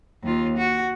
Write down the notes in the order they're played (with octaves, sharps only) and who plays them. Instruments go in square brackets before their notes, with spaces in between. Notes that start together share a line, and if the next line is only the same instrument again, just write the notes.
[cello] D#2 F4
F#4